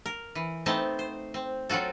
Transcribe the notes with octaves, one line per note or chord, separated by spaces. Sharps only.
A#4
E3
A3 B3 C4 D#4 A5
C5
C4
F#3 C4 F4 F#4 A4